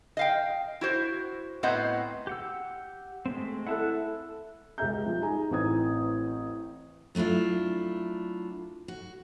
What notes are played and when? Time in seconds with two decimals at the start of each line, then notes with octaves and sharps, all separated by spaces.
0.17 D#5 F5 G5
0.81 E4 F#4 C5
1.63 A2 B3 C4 D#5 F#5 A#5
2.27 G4 F#5 E6
3.26 G#3 A3 C4
3.66 E4 A4 F#5 A5 F#6
4.78 C#2 G4 G#4 E5 A#5 G6
5.06 F3
5.21 D#4 G#4 G#5 A#5
5.50 A1 E3 C4 A#5 D#6 G#6
7.15 F#3 A3 D4 E4 F4
8.88 F#4